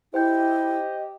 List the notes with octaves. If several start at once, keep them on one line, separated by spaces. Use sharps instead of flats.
E4 G4 C5 D#5 G5 G6